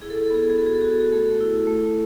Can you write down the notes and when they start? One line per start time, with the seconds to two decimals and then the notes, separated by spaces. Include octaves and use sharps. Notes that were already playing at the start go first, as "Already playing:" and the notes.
0.02 E4 G#4
0.10 A4
0.18 G#4
0.26 A4
0.30 B3 G#4
0.42 A4
0.50 G#4
0.57 F#4 A4
0.66 G#4
0.75 A4
0.82 F#4 G#4
1.00 G#4
1.12 A3 A4
1.41 E4
1.67 A3